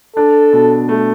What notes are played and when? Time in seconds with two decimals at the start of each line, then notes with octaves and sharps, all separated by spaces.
0.17 D4 A4
0.53 B2
0.89 A3